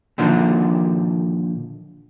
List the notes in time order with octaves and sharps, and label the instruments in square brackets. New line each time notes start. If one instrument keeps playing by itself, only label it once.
[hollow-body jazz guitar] A#2 D3 D#3 F3